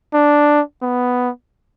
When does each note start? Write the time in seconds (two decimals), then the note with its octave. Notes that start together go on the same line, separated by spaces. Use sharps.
0.14 D4
0.82 B3